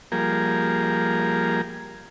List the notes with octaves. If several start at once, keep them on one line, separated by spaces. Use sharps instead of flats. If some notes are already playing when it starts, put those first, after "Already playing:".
F3 G3 A#3 G#4 A#4